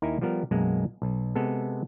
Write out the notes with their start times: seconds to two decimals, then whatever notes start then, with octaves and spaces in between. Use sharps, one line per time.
0.02 D#2 D#4 E4 A#4 G#5
0.21 F3 G3 B3 A#4 F5
0.51 B1 F#2 G#3 A#3 F#5
1.02 B1
1.35 C3 G#3 B3 A4